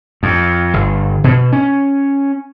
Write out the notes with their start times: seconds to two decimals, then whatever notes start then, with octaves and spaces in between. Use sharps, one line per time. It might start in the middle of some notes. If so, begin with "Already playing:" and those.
0.23 F2
0.74 G1
1.24 B2
1.53 C#4